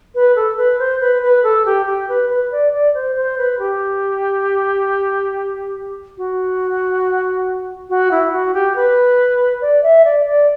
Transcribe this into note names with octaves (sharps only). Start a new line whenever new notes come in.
B4
A4
B4
C5
B4
B4
A4
G4
G4
B4
B4
D5
D5
C5
C5
B4
G4
F#4
F#4
E4
F#4
G4
B4
D5
E5
D5
D5